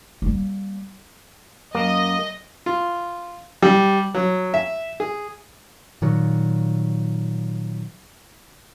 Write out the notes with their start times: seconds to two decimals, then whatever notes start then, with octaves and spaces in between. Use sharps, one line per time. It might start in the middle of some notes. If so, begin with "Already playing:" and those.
0.22 G3 A#3
1.75 F#2 A#3 D#5
2.66 F4
3.62 G3
4.15 F#3
4.54 E5
5.00 G#4
6.02 A#2 D#3 F#3